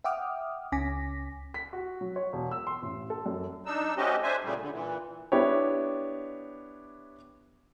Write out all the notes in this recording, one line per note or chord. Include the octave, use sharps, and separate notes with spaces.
E5 F#5 G5 D6 D#6 F6
C#2 C#4 G#5 D6 A#6 B6
B6
F#4
F#3
C#5
E1
E6
C6
A1
A4
F#2
D4 D#4 E6
A3 C4 C#4 F#4 G4 D#5
D4 C5 E5 G#5
A#2 C#3 G3 A3
D3
A#2 E3
B3 D4 E4 G4 C#5